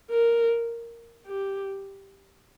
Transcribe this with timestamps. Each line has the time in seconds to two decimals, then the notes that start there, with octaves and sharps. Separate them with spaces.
0.10 A#4
1.26 G4